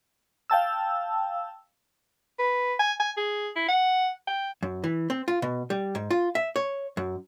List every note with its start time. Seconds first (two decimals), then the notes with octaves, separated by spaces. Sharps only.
0.50 F5 G5 A5 E6
2.39 B4
2.79 G#5
3.00 G#5
3.17 G#4
3.56 E4
3.68 F#5
4.27 G5
4.63 F#2
4.84 E3
5.10 C4
5.28 F4
5.42 B2
5.70 G3
5.95 G#2
6.11 F4
6.35 E5
6.56 C#5
6.97 F#2